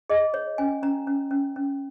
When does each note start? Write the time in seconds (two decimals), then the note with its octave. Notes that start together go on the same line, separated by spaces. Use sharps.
0.10 G#4 D#5
0.34 C#5
0.58 C#4 G#5
0.83 C#4 A#5
1.07 C#4
1.31 C#4
1.56 C#4